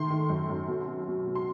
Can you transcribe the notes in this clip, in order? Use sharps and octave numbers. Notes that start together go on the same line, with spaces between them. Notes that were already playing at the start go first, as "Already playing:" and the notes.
Already playing: D#3 A3 C6
D#3
F#2
F#2
B2
B2
B2
B2
C6